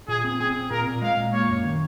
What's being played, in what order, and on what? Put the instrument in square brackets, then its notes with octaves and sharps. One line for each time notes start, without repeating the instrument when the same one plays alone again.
[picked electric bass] A#2 [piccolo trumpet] G#4
[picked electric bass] C4
[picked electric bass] C4 [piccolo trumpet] G#4
[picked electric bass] C4
[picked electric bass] A#2 [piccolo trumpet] A#4
[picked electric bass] A#2
[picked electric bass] G#3 [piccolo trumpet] F5
[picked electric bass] A#2
[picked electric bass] A#3 [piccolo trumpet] C#5
[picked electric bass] F#2
D#3